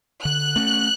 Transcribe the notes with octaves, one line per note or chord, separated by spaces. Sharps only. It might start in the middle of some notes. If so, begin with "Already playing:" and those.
D3 F#6
A3 C#4